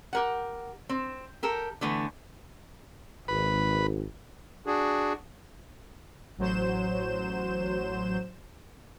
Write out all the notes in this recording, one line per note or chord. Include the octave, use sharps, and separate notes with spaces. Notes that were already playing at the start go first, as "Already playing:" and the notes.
G4 A#4 F#5
C4
G4 A4 A#4
D3 E3 A3 B3
G#1 B4 B5
D4 F#4 G#4
A1 F#3 C5 G6 E7